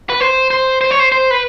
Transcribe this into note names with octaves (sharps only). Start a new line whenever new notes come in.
B4
C5
C5
C5
C#5
C5
C5
B4